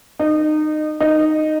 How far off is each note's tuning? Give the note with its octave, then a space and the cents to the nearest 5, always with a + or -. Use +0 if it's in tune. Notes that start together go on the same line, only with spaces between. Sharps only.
D#4 -25
D#4 -10